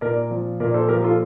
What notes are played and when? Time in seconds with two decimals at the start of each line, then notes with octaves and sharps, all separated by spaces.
0.01 A#2 A#4 D5
0.31 F3
0.60 A#2 A#4 D5
0.74 A4 C5
0.89 F3 G4 A#4
1.04 F4 A4